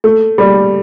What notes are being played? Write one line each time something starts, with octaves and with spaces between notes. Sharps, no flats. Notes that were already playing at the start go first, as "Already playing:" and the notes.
A3
G3